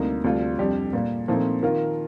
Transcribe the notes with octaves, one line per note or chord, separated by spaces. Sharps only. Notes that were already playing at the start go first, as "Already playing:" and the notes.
Already playing: D2 C3 G3 A#3 D#4
D2 C3 G3 D4 F4
F2 C3 G3 D4 G4
A#2 G3 A#3
A#2 F3 A3 C4 D#4
D#3 A#3 F4 A#4